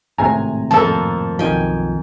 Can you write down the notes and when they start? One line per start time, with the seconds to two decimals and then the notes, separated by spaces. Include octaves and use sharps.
0.18 G#1 A2 C3 G#5 A#5
0.71 F2 F3 A#3 A4 A5
1.39 B1 D#3 F3 G5 G#5